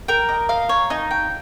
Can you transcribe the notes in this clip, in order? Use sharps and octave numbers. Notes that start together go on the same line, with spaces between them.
A#4 G5
D#5
D#5 F5
C#5
D#4 G#5
G5